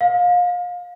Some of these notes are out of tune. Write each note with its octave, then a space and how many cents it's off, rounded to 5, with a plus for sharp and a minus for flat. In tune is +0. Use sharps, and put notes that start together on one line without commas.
F5 +30